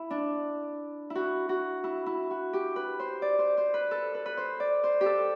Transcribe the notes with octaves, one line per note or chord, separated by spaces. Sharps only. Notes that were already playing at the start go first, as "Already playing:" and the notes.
Already playing: E4
D4
E4
F#4
F#4
E4
E4
F#4
G4
B4
C5
D5
C5
C5
B4
A4
B4
B4
C5
D5
C5
G4
A4